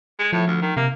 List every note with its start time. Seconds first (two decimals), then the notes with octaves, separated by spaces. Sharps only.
0.19 G#3
0.33 A2 F3
0.47 D2
0.62 D#3
0.77 C3 A#3